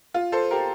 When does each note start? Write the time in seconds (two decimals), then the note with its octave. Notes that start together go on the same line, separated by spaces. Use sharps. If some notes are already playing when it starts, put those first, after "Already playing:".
0.14 F4
0.32 A4 C5
0.51 G4 A#4